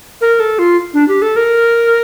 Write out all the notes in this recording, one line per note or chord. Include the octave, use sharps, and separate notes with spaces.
A#4
A4
F4
D4
G4
A4
A#4